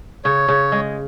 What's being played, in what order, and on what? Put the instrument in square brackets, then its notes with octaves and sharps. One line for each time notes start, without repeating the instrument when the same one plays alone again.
[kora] C#3 [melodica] C#5
[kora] C#3
G#3